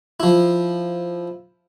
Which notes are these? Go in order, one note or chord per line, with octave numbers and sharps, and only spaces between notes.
F3 E4